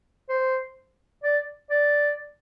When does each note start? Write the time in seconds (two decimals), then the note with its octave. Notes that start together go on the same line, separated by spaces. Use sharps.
0.29 C5
1.24 D5
1.71 D5